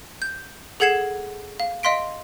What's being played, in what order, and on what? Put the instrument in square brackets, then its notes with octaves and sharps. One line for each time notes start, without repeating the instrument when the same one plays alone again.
[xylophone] G6
G#4 A4 F#5 G#6 C7 E7
F5
D#5 F5 C6 B6 D7